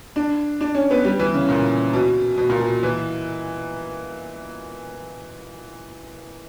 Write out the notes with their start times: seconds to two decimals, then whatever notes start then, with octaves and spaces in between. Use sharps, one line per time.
0.16 D4
0.61 D4
0.75 C#4
0.91 B3
1.05 G3
1.19 E3
1.34 C#3
1.49 A#2
1.93 B2
2.37 B2
2.50 A#2
2.60 B2
2.83 E3